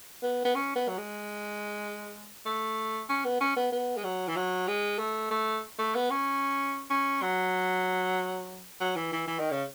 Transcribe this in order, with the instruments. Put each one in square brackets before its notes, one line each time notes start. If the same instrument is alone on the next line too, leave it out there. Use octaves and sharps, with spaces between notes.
[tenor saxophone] B3
B3
C#4
B3
F#3
G#3
A3
C#4
B3
C#4
B3
B3
G#3
F#3
E3
F#3
G#3
A3
A3
A3
B3
C#4
C#4
F#3
F#3
E3
E3
E3
D#3
C#3